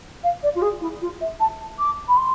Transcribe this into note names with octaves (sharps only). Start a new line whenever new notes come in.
F5
D5
F4
G#4
E4
F4
E5
A5
D6
B5
C6